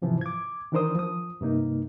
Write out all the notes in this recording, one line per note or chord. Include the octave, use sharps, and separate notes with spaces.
G#2 C3 E3 F3
D6 G#6
D#3 E3 D4 A#4 C5 D#6
F3 D#6
G2 C3 A#3 D#4